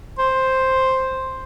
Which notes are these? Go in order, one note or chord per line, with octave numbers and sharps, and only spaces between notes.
C5